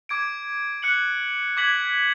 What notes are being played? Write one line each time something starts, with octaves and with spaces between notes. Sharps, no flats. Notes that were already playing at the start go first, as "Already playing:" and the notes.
D6 G#6 D7
F#6 C#7 F#7
D6 G#6 B6 F#7